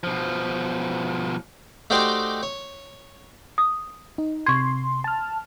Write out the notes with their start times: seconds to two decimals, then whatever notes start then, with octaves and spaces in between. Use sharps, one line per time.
0.03 B2 F3
1.90 A3 D#4 F#4 G4 C5 D5
2.43 C#5
3.58 D#6
4.18 D#4
4.46 C3 C6 C#6 G#6
5.04 A5 F6